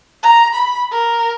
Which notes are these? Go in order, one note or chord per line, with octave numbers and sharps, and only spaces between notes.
A#5
B5
A#4